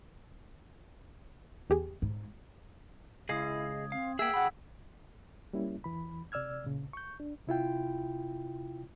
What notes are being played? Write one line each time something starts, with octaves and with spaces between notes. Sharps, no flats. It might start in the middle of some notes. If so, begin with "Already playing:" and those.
E2 G4 G#4
G#2
C#2 E4 G#4 D#5 F5 D#6 G#6
C4 F5
A#3 G#4 E5 F#5 G5 E6 G#6 B6
D3 F#5 B5
G3 A#3 C#4 E4
E2 E3 B5
C3 D5 E6 F6 G#6
A#2 C#3
C#6 G6
D4
C3 E4 F4 G5